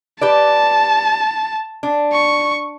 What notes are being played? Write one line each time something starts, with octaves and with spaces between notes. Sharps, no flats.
G4 B4 D5 A5
D4
C#6